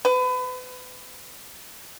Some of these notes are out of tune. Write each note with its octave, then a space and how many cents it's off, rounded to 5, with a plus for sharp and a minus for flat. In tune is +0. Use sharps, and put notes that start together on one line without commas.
B4 +35